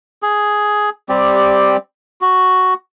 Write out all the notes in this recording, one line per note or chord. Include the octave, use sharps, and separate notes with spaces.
G#4
G3 C4 G4 D5
F#4